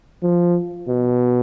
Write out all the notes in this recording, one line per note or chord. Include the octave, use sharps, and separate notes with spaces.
F3
B2